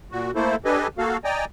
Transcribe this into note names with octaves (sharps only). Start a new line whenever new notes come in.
A#2 F#4
A3 A#3 E4 A4 C5
D4 G4 A4 B4 D#5 G#5
A#3 F#4 A4 F5
D5 D#5 G5 G#5 A#5